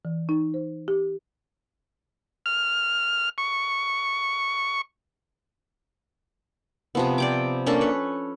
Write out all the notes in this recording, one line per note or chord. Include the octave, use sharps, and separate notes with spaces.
E3
D#4
C5
G4
F6
C#6
C3 F3 B3
D5 G5 D6
A#3 C#4 D4 A4
B4 C#5